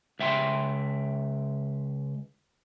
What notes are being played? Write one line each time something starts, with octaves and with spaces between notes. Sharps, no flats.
C#2 E5 G5 C6